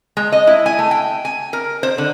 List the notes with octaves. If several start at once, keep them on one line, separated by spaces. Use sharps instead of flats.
G#3
D#5
E4
G#5
A3
G5
G#5
A#4
C5
D3